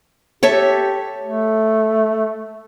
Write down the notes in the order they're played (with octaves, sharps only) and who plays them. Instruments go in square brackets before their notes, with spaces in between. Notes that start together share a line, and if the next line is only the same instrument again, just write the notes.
[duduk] G4 [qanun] A4 C#5 E5
[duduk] A3